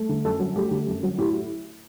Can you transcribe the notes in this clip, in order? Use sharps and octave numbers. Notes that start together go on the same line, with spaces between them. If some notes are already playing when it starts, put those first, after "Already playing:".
Already playing: A3
D3
F#2 A4
F#3
A3 G4
D3
F#2
F#3
A2 G4